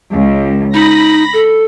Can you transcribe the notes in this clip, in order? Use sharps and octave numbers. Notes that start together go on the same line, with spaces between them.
C#2
D#4 B5 A#6
A4